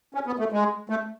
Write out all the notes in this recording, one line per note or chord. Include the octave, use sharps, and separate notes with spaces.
C#4
B3
A3
G#3
A3